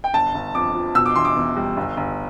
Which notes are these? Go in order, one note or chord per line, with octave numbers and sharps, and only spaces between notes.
G5
G1 A5
G1
F2 D6
F3
B2 E6
D6
E2 C6
D6
E2
G3
G1
G1